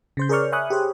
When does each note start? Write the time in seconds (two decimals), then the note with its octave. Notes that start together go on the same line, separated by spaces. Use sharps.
0.17 C#3 C5 G6
0.29 G#4 A#4 C#5 D5 C#6 F6
0.52 E5 G#5 B5 C#6 D#6 F#6
0.70 G4 G#4 C5 C#5